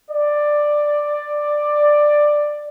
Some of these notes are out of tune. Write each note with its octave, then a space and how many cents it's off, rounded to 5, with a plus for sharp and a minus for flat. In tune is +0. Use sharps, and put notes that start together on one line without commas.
D5 +10